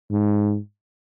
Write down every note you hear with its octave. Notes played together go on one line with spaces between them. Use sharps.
G#2